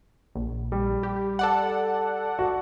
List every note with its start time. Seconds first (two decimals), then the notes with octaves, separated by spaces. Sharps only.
0.35 A#1
0.72 G3
1.03 G4
1.39 A4 D5 F#5
2.39 F#4